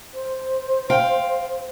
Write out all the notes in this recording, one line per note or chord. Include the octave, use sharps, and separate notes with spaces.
C5
F5 G5